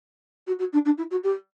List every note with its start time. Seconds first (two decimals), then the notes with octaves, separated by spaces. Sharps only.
0.47 F#4
0.59 F#4
0.72 D4
0.85 D4
0.97 E4
1.11 F#4
1.23 G4